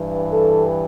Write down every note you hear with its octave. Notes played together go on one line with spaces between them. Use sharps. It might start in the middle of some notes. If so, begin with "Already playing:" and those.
Already playing: G2 E3
A4